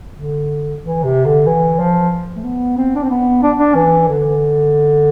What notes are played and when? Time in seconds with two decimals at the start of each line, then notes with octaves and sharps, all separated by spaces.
0.16 D3
0.82 E3
1.04 C3
1.25 D3
1.47 E3
1.80 F3
2.36 A3
2.44 B3
2.77 C4
2.95 D4
3.03 C4
3.10 B3
3.43 D4
3.59 D4
3.75 E3
4.09 D3